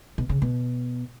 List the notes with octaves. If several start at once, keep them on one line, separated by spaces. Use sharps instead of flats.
B2
C#3
B2